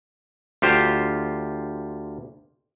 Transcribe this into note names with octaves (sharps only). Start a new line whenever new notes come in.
D2 F4 G4 C5